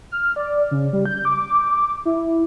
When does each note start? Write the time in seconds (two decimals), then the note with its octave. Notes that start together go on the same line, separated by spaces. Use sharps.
0.11 F6
0.36 D5
0.71 C#3
0.93 G3
1.06 G6
1.25 D6
2.05 E4